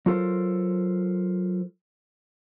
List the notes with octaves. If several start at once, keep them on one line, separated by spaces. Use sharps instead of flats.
F#3 F4 A4 A#4 C5